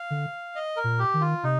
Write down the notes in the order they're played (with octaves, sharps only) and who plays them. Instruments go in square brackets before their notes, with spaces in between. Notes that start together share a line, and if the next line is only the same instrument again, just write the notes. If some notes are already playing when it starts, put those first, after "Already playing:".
Already playing: [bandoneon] F5
[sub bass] D3
[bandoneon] D#5
A#4
[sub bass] A#2
[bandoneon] G4
[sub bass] D#3
[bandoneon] F4
[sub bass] C3 [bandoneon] D#4